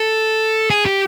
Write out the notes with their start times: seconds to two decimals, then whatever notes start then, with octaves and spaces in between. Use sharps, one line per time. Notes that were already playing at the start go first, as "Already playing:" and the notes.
Already playing: A4
0.70 G#4
0.86 G4